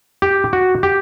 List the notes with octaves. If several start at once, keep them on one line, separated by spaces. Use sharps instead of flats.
G4
F#4
G4